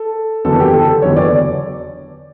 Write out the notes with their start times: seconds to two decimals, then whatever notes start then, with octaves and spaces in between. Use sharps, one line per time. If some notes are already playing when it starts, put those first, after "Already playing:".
Already playing: A4
0.45 F#1 E2 D3 F#3 B3 A4
0.60 G4
0.74 A4
1.02 F#1 E2 D3 F#3 B3 C#5
1.16 D5